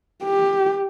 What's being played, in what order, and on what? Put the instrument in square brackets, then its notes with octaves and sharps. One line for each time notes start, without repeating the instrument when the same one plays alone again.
[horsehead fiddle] G4